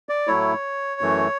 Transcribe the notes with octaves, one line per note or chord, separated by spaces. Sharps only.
D5
A2 F#3 A3 E4 C#5
F#2 E3 A3